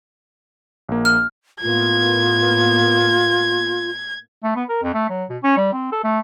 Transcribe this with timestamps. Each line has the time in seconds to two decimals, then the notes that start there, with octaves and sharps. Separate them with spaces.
0.89 A#1 A#3
1.05 F6
1.61 A2 A#3 B3 F4 G#6
4.43 A3
4.56 B3
4.69 A#4
4.83 F2
4.94 A3
5.09 F#3
5.30 B2
5.43 C#4
5.57 G3
5.73 C4
5.92 A4
6.04 A3